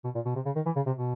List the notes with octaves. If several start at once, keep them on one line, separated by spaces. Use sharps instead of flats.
B2
A#2
B2
C3
C#3
D#3
E3
C#3
C3
B2